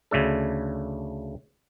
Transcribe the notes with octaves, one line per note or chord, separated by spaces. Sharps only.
D2 C#3 A3 D4 A4